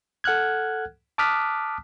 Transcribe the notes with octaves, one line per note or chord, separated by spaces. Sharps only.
A4 F#5 F6 F#6 G#6
A5 D6 D#6 F6 F#6 B6